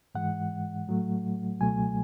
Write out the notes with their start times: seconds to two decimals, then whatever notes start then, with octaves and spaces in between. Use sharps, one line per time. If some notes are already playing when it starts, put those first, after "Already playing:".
0.15 G#2 E3 G#3 F#5
0.87 A2 F#3 A3
1.61 C#2 B2 F#3 A3 G#5